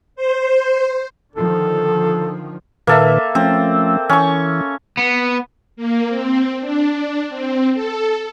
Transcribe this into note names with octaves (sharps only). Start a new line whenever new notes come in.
C5
D3 D#3 F3 A4
A#2 D#3 A#3 A4 B4 E5
F3 A3 C4 C#4
E3 C#4 C#6
B3
A#3
C4
D4
C4
A4